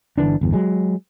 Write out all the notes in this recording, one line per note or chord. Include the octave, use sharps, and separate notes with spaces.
G1 D3 E3 D4
G1 E2
F#3 G#3